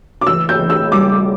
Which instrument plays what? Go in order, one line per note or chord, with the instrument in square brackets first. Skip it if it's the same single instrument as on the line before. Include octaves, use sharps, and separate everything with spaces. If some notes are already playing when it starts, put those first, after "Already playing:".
[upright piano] D6
[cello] E3 [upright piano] E6
[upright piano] G6
[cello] E3
[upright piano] E6
[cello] G3 [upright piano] D6